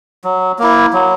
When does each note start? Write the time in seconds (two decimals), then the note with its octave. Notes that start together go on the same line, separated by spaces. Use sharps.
0.24 F#3
0.59 A#3 E4
0.93 F#3